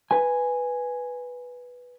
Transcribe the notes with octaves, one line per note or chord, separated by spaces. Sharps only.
B4 G#5